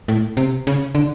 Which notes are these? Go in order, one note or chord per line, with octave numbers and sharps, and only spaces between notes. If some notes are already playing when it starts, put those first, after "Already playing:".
A2
C3
C#3
D3